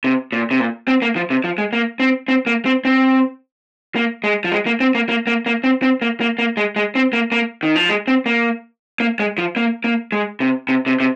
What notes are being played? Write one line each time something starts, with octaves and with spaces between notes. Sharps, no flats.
C3
A#2
C3
A#2
C4
A#3
F3
C3
F3
G#3
A#3
C4
C4
A#3
C4
C4
A#3
G#3
F3
G#3
A#3
C4
A#3
A#3
A#3
A#3
C4
C4
A#3
A#3
A#3
G#3
G#3
C4
A#3
A#3
D#3
F3
G#3
C4
A#3
A#3
G#3
F3
A#3
A#3
G#3
C3
C3
C3
C3